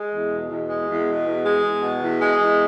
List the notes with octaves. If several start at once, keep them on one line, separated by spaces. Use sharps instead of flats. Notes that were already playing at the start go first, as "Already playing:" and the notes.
Already playing: G#3
E2
B2
E2
G#3
E2
B2
E2
G#3
E2
B2
E2
G#3
E2